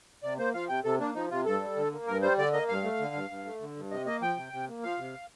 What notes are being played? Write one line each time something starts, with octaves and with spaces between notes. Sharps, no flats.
C3 D5
A#3 C5
F3 F5
C3 G5
C3 A4
A#3 D4
F3 D#4
C3 F4
G2 A4
G3
D3
A#3
G2 A#4
G3 C5
D3 D5
A#3 D#5
G2 F5
A3
D3
G2
G2
A3
D3
G2
C3 D#5
A#3 D#5
F3 G5
C3
C3
A#3
F3 F5
C3